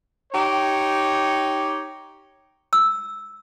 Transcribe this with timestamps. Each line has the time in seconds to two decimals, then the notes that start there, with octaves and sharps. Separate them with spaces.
0.32 D#4 G4 C#5
2.73 E6